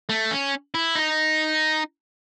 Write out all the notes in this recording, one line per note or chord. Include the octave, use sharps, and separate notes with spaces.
A3
C#4
E4
D#4